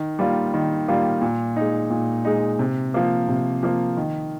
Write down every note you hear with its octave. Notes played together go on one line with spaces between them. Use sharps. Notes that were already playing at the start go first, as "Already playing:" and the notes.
Already playing: D#3
G3 A#3 F4
D#3
G3 A#3 F4
A#2
G#3 D#4
A#2
G#3 D#4
C3
F3 A#3
C3
F3 A#3
D#3